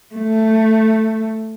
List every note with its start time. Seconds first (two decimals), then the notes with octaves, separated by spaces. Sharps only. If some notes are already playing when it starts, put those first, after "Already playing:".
0.14 A3